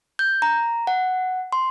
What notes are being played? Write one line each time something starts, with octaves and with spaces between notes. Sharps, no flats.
G6
A#5
F#5
C6